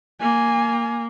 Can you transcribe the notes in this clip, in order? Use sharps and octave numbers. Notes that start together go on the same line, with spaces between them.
A#3 G#5